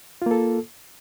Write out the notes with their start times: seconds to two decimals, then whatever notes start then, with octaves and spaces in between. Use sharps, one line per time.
0.22 F4
0.26 A#3
0.31 A4